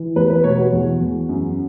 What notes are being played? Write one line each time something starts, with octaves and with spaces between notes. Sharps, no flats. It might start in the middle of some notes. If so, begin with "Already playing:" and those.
Already playing: E3
E2 B4
B4
B2 C#5
F#4
E2
E2
F#2